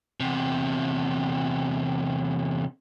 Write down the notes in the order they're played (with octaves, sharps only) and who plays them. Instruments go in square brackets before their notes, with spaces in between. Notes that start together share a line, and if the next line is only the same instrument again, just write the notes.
[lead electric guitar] E2 C3